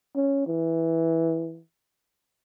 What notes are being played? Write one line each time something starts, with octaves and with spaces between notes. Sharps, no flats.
C#4
E3